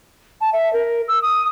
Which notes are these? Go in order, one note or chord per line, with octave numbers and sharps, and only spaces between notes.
A5
E5
A#4
E6
D#6